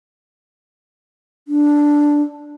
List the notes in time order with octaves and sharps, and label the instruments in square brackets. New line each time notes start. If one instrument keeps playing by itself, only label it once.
[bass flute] D4